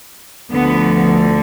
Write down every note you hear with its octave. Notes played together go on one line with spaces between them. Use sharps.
D2 D3 F3 B3